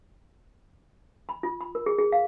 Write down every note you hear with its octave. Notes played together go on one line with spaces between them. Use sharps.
B5
F4
B5
A#4
G#4
G#4
F5